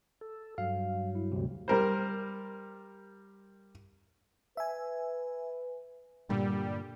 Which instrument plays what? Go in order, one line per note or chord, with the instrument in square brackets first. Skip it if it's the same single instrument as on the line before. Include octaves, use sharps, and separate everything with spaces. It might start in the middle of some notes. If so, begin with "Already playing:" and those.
[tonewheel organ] A4
[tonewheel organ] G2 F#3 [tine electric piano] F5
[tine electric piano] E4
D2 C3
[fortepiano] G3 A#4 C5
[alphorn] B4 [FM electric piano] E5 G#5
[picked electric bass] G2 A#2 D3 [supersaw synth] G3